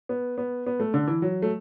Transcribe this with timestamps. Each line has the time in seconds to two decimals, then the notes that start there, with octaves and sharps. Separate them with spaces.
0.09 B3
0.38 B3
0.66 B3
0.80 A3
0.94 D3
1.07 E3
1.22 F#3
1.42 A3